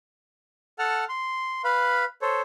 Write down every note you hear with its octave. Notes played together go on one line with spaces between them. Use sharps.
A4 F#5 A5 F6
C6
B4 F5 B5
A4 C5 C#5